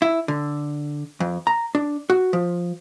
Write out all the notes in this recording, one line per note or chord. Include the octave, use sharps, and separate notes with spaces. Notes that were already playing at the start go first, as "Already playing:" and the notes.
E4
D3
F2
A#5
D4
F#4
F3